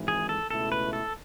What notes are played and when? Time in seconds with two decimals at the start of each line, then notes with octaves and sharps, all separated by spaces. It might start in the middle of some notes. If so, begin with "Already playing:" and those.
Already playing: G#1 G#2 E3
0.08 G#4
0.29 A4
0.50 C#2 B2 A3 E4 A4
0.72 B4
0.93 A4